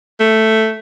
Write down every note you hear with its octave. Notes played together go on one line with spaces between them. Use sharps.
A3